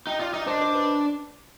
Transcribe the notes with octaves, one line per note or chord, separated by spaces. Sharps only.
D#4 G5
F4 D5
D#4 D#5
D4 C5
C5
B4